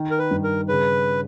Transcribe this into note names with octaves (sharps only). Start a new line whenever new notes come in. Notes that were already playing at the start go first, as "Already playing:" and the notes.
Already playing: D#3
A#4
B4
G2
A#4
C#3 B4